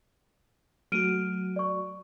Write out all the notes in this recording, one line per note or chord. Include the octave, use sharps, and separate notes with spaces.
F#3 A3 F#4 F6 D7 D#7
D5 C#6